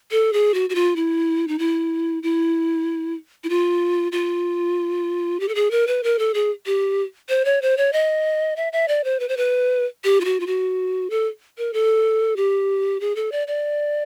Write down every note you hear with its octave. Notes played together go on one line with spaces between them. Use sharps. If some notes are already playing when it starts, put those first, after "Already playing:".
A4
G#4
F#4
F#4
F4
E4
D#4
E4
E4
E4
F4
F4
G4
A4
G#4
A#4
B4
A#4
A4
G#4
G4
C5
C#5
C5
C#5
D#5
E5
E5
D5
C5
B4
C5
B4
G4
F4
F#4
F4
F#4
A4
A#4
A4
G4
G#4
A4
D5
D5